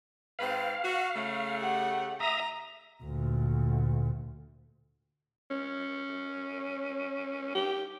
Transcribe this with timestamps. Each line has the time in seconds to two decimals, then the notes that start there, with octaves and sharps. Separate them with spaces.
0.39 G#2 C4 B4 F5
0.84 F#4
1.15 C#3 A3
1.58 G4 F#5
2.20 E5 A#5 D#6
3.03 D2 A#2
5.50 C#4
7.55 G4